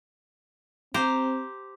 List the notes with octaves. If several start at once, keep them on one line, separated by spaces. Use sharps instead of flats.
C4 G4 C5 A#5